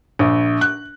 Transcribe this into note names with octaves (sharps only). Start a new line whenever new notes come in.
A#1
F#6